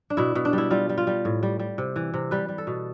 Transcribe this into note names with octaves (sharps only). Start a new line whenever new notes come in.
D4
B2 E4
B2
D4
G3 E4
G3 F4
G3
F4
G3
A2
G3
G3
C3
E3
C3
G3 B4
G3
A4
B2